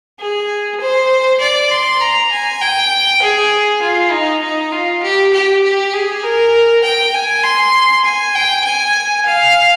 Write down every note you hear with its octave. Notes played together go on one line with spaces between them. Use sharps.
G#4
C5
D5
C6
A#5
G#5
G5
G#4
F4
D#4
D#4
F4
G4
G4
G4
G#4
A#4
G5
G#5
C6
G#5
G5
G#5
F5